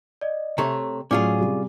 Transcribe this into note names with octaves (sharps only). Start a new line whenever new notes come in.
D5 D#5
C3 A3 C#5 A#5
A2 F#3 C#4 F4 G#4 D5 G#5 D6
C3 G3